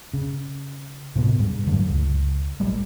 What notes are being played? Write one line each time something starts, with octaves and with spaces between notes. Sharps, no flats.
C#3
A2 C3 B3
G#2 G3
F#2 D3 F#3 A3
C#2
A#1 G3 A3